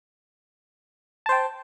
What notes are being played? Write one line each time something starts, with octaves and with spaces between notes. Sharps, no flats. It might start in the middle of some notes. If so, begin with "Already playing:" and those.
C5 G5 A5